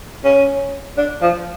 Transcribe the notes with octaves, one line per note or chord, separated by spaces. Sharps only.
C#4
D4
F3